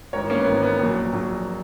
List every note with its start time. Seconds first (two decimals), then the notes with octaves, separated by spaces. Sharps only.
0.13 G#1 G#2 E3 A#4 C#5
0.30 A#3 C#4
0.39 B3
0.47 G#1 G#2 E3 A#3
0.62 B3
0.79 A#1 A#2 F#3
1.13 A#1 A#2 F#3